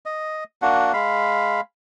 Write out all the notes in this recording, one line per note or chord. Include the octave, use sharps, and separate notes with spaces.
D#5
A#3 D4 F#4 F#5
G#3 F5 B5